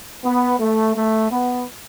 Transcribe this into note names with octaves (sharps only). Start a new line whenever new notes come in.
B3
A3
A3
B3